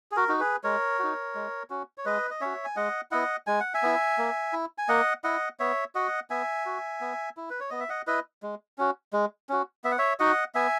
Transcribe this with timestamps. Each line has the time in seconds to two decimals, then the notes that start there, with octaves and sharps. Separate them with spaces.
0.11 G#4
0.16 F#4 A#4
0.28 D#4 F#4
0.40 G#4 B4
0.64 G#3 A#4 C#5
0.99 D#4 F#4
1.35 G#3
1.70 C#4 F#4
1.98 C#5
2.05 G#3 B4 D#5
2.31 D#5
2.41 C#4 F#4 C#5 E5
2.65 G#5
2.76 G#3 D#5 F#5
3.11 B3 E4 D#5 F#5
3.47 G#3 G#5
3.60 F#5
3.74 E5 G#5
3.83 B3 E4
4.18 A#3
4.53 E4
4.78 G#5
4.89 A#3 D#5 F#5
5.24 E4 D#5 F#5
5.60 B3 C#5 E5
5.95 F#4 D#5 F#5
6.30 B3 E5 G#5
6.66 F#4
7.01 B3
7.37 E4
7.50 B4
7.60 C#5
7.70 B3 D#5
7.80 E5
7.89 D#5 F#5
8.07 E4 B4 D#5
8.43 G#3
8.78 C#4 F#4
9.13 G#3
9.49 C#4 F#4
9.84 B3 E5
9.91 F#5
9.98 C#5 E5
10.20 D#4 F#4 D#5 F#5
10.55 B3 E5 G#5